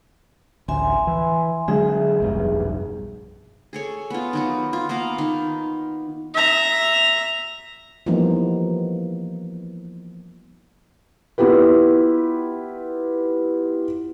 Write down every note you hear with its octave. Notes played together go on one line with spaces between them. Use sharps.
A1 D2 E5 G#5 C6
E3
D3 F#3 G#3 G#4 E5
F1 B1 G2
G#4 A4 C#5
B3 F4
D#3 F#3 B3
F4
A#3 B3 F5 A#5
D#3
E5 A#5
E3 F3 G3 A#3 B3 D#4
B3 E4 F4 G4 B4